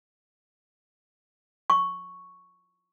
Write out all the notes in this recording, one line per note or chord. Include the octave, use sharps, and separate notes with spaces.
C#6